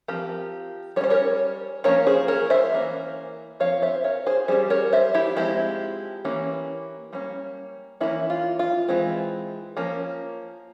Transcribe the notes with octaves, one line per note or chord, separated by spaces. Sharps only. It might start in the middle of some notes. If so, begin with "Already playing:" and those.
F3 C4 G4 A#4
G3 A#3 C#4 C5 C#5
A#4 C#5
F3 A#3 C#4 A#4 C#5
G#4 C5
A#4 C#5
C5 E5
E3 A#3 C#4
F3 C4 C#5 F5
C5 E5
A#4 C#5
G#4 C5
G3 C#4 G#4 C5
A#4 C#5
C5 E5
E4 G4
F3 G#3 C4 E4 G4
E3 A#3 C#4
G3 A#3 C#4
E3 A#3 C#4 E4
F4
F4
E3 G#3 C4
F3 A#3 C#4